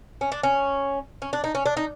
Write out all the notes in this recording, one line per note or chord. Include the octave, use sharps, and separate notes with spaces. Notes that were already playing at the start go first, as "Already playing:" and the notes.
C#4
D4
C#4
C#4
D4
D#4
C#4
D4
D#4